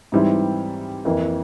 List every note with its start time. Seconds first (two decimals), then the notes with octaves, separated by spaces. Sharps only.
0.12 G#2 E3 G3 C4 E4
1.05 F2 E3 A#3